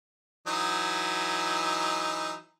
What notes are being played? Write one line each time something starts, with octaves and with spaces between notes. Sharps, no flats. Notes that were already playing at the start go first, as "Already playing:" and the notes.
E3 F#3 D#4